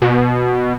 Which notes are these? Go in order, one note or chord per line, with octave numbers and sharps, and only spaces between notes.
B2